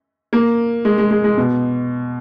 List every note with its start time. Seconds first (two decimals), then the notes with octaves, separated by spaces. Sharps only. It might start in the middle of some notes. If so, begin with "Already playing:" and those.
0.33 A#3
0.85 G#3
0.98 G#3
1.11 G#3
1.24 G#3
1.37 B2